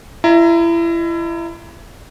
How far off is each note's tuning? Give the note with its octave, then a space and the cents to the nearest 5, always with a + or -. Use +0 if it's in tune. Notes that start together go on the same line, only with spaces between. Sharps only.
E4 +30 D#5 +0 A#5 +0